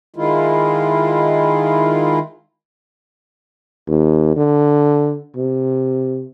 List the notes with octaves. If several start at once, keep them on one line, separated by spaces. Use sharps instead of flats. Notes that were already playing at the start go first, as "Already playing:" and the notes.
D#3 G#3 E4 F4
D#2
D3
C3